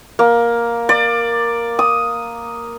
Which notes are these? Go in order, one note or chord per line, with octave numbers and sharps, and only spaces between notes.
A#3
D5
D#6